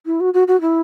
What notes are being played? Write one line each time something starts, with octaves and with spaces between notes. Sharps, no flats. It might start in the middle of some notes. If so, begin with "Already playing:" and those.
E4
F#4
F#4
F#4
E4